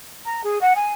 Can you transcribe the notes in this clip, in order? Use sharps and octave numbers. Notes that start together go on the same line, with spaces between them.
A#5
G#4
F#5
G#5